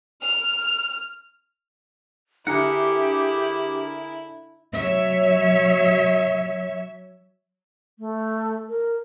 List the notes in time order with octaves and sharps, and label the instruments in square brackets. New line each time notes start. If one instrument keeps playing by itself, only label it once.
[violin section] F6
[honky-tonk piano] D3 E5 [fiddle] E4 [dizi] G4 [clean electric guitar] G#4 A#4 F#5
[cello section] F#3 C#5 E5
[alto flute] A3
A#4